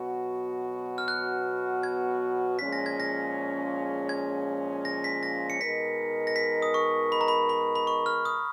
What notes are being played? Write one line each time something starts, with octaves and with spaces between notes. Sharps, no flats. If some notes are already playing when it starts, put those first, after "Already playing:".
Already playing: B2 F#3 B3 F#4
F6
F#6
G#6
A#2 F3 G#3 C#4 G#4 B6
A#6
G#6
A#6
G#6
A#6
B6
A#6
C#7
B2 G#3 D#4 A#4 B6
A#6
B6
D#6
C#6
B5
A#5
B5
B5
B5
C#6
F6
D#6